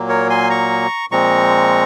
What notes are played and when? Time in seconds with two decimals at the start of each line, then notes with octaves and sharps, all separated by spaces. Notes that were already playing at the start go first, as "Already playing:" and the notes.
Already playing: A#2 F#3 A#3
0.09 A#4 C#5
0.30 G#5 C6
0.50 A#5 C#6
1.11 A#2 F3 G#3 C4 A#5 C#6